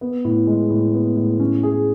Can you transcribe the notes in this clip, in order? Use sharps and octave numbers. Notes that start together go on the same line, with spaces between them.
B3
A2
G#3
A2
B3
A2
C#4
G#4